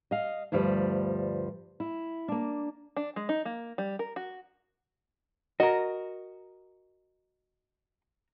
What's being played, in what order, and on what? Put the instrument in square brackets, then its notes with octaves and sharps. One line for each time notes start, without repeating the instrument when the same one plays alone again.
[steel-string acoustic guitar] D#5 F5
D2 G2 F3 G3 B4
E4
A#3 D4
[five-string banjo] D4
G#3
D#4
A#3
G3
A#4
F#4
[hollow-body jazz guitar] F#4 A#4 [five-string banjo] D#5